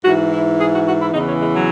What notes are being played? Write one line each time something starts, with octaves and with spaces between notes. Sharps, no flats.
G#2 E3 F#4
E4
G#4
F#4
F#4
E4
E2 C#3 E3 D#4
C#4
G#3
F#3